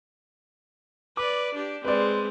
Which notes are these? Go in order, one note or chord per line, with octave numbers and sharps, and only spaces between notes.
B4 D5 D6
D4 G4
G#3 C4 B4 D5